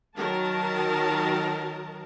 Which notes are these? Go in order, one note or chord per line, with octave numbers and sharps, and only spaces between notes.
D#3 F#3 A#4 A5